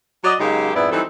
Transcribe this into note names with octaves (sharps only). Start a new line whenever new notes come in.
F#3 F#4 D5 D#5
C#3 F#3 G#3 A#3 D#4 G4
F2 G#2 B3 E4 B4 D5
E3 F#3 G3 C4 D#4 A4